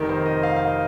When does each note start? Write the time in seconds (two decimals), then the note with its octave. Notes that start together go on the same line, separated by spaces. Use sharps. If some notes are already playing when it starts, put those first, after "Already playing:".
Already playing: F1 F2 C3 D#3 A#4
0.09 C5
0.26 D#5
0.43 F5
0.56 F5
0.67 D#5